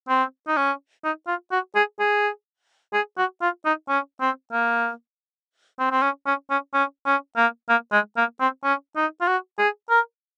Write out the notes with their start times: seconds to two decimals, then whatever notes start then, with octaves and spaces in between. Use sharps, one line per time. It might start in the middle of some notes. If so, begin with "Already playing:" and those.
0.09 C4
0.48 D#4
0.57 C#4
1.04 D#4
1.27 F4
1.51 F#4
1.75 G#4
2.00 G#4
2.93 G#4
3.18 F#4
3.42 F4
3.65 D#4
3.89 C#4
4.20 C4
4.52 A#3
5.79 C4
5.91 C4
6.02 C#4
6.26 C#4
6.50 C#4
6.74 C#4
7.06 C#4
7.37 A#3
7.69 A#3
7.92 G#3
8.17 A#3
8.40 C4
8.64 C#4
8.96 D#4
9.21 F4
9.27 F#4
9.59 G#4
9.90 A#4